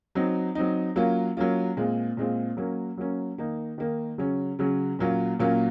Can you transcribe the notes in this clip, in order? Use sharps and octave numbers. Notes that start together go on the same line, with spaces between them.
F#3 C4 D#4
F#3 C4 D#4
F#3 A#3 C#4 F4
F#3 A#3 C#4 F4
A#2 G#3 C4 F4
A#2 G#3 C4 F4
F#3 A#3 C#4
F#3 A#3 C#4
D#3 A#3 D#4
D#3 A#3 D#4
C#3 F#3 C#4
C#3 F#3 C#4
A#2 F#3 A#3 C#4 F4
A#2 F#3 A#3 C#4 F4